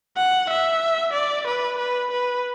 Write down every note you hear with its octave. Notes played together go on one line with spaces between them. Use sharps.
F#5
E5
D5
B4
B4
B4